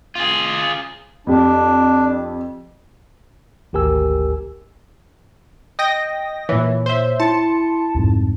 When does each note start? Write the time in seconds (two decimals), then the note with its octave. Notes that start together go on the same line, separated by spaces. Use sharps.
0.15 F4 G#4
1.27 F2 D4 G4
3.73 G#1 D2 G4 A#4 G#5 E6
5.79 D#5 G5 A#6
6.49 A#2 E3 C#5
6.86 C5 E5
7.20 E4 A5 C6 C#7
7.95 C2 F2 G#2